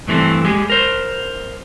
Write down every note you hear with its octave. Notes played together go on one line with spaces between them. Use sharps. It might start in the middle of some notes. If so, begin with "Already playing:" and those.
G2 E3 A3 C4
G#3 G4 G#4
A#4 C5